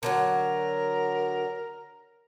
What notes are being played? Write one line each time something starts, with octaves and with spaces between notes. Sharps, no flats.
D3 F3 F#3 A#4